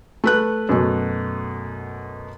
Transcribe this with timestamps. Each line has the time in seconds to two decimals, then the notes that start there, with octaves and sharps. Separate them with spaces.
0.24 A3 B4 F#6
0.69 F#2 B2 A3